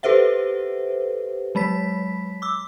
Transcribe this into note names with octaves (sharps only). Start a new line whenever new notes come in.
G4 A4 B4 C5 E5 F#5
F#3 G#3 B5 B6
D6 E6